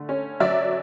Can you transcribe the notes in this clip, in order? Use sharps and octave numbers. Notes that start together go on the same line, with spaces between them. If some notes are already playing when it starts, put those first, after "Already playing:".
Already playing: D3 A3
C#4
F#3 D5 E5